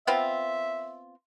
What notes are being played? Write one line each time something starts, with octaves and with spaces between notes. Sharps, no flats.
B3 C4 F4 E5